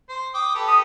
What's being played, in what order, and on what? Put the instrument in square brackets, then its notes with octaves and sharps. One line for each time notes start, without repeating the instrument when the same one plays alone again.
[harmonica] C5
G5 D6 D#6
G4 A4 B4
[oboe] D#6